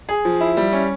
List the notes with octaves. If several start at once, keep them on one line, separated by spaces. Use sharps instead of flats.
G#4
F3
E4
G3
C#4